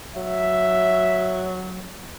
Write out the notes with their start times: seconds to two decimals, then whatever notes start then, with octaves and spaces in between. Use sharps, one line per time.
0.16 F#3 E5